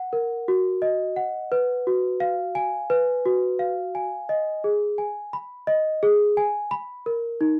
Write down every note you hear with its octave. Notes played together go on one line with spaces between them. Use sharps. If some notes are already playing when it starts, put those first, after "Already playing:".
Already playing: F#5
A#4
F#4
D#5
F#5
B4
F#4
F5
G#5
B4
F#4
F5
G#5
D#5
G#4
G#5
B5
D#5
G#4
G#5
B5
A#4
D#4